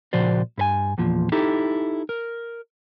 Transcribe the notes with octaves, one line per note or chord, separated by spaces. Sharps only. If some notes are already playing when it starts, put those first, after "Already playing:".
C#2 A#2 F3 F#4 C5 D5
G2 B4 G#5
E2 A#2 F3
D#4 E4 G4 A4
A#4